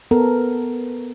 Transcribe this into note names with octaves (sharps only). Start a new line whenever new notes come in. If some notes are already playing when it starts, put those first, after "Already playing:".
B3 A4 A#4